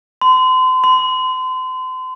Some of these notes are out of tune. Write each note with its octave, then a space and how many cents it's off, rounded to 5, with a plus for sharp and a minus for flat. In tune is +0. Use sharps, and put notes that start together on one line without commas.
C6 -35
C6 -35